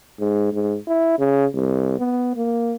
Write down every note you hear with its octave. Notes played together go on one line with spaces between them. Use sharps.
G#2
G#2
E4
C#3
C2
B3
A#3